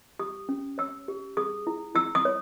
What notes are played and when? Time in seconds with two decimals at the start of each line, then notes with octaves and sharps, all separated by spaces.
0.19 G4 D#6
0.49 C#4
0.78 C#5 E6
1.08 G4
1.37 G#4 D#6
1.67 E4
1.95 E4 E6
2.15 D#6
2.25 C#5